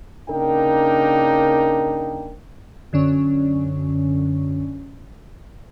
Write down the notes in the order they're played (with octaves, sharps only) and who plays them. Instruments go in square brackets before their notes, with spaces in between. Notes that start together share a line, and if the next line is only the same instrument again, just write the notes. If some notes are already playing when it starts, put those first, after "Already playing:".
[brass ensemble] C#3 A#3 D4 D#4 A#4 G5
[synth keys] F#2 D3 C#4